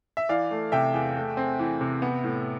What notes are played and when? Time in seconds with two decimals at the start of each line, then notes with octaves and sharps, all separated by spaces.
0.17 E5
0.29 E3 D5 F5
0.51 A3
0.72 C3 E5 G5
0.94 E2
1.16 A3
1.37 C4
1.59 E3
1.81 C3
2.02 B3
2.24 A2